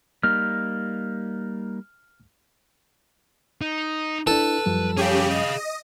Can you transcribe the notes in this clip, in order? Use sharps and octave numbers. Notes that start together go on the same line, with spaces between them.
G3 A#3 D#4 F6
D#4
D4 E4 A4 B4
F#2 F3 G3
C#4 G4 G#4 F5
D#5